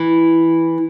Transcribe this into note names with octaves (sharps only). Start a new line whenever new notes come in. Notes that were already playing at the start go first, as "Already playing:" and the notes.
Already playing: E3